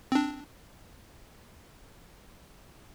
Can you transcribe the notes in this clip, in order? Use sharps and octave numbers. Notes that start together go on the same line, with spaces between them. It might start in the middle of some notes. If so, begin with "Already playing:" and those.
C4 D4